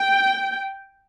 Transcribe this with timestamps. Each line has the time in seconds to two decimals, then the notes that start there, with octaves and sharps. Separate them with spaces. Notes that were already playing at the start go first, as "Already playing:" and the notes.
Already playing: G5